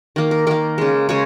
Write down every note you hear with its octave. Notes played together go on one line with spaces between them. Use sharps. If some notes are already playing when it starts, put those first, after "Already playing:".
D#3 A#3
A#4
D#3 A#3 A#4
C#3 G#3
C#3 G#3 C#5